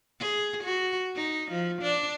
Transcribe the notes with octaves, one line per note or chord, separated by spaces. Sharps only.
G#4
F#4
D#4
F3
D4